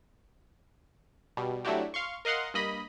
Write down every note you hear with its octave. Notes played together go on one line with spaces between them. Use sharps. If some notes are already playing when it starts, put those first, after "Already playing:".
B2 G3
F#3 A3 D4 E4 F#4 G4
F5 C6 C#6
A#4 D#5 F5 F#5 C6
G2 A#3 D#5 B5